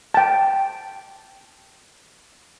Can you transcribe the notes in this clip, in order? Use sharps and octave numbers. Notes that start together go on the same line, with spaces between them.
G5 A5